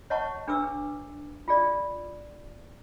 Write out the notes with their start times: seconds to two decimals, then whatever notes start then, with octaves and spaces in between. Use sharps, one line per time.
0.10 C#5 D#5 F#5 A5 C#6
0.48 D4 G#4 B4 D6 E6
1.48 F4 G#4 D5